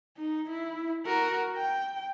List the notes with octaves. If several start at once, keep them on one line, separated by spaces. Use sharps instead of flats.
D#4
E4
F#4 A#4
G5